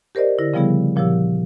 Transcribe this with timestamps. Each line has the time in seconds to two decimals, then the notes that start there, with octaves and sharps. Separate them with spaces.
0.15 G4 A#4 C5 D5 D#5
0.38 D3 E4 A#6
0.54 C#3 F3 G3 B3 E4 G#4
0.96 A#2 F3 F#3 G4 C#5 E6